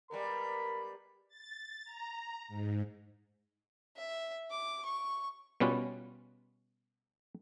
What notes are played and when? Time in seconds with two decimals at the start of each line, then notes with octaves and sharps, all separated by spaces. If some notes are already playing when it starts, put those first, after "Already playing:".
0.11 G3 G#3 B3 A#4 B5
1.28 A6
1.85 A#5
2.48 G#2
3.97 E5
4.51 D6
4.85 C#6
5.60 B2 G3 B3 C#4 F4 B4